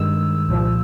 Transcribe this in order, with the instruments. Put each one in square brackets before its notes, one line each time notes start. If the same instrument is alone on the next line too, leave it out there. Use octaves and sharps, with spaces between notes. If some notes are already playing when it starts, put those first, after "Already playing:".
Already playing: [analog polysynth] G2 D#3 G#3 E6
C2 A#2 F3